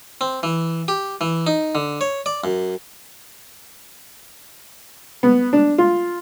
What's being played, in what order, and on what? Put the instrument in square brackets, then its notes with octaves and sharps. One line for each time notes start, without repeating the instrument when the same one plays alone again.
[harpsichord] C4
E3
G4
E3
D#4
D3
C#5
D5
F#2
[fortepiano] B3
D4
F4